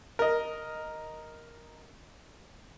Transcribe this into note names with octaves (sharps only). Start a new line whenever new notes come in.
A#4 D#5